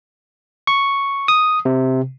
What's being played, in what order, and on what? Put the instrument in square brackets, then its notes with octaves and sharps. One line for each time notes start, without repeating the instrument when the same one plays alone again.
[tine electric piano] C#6
D#6
C3